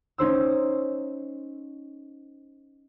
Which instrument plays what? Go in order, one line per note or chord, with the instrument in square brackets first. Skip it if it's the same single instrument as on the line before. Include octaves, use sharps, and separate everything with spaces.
[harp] C#4 D#4 C5 E6